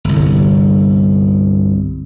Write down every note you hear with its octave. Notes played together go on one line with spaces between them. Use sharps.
G1 C2